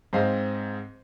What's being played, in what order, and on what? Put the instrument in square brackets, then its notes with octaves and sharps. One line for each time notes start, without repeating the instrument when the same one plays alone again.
[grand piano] G#2 C4 C5 D#5 F5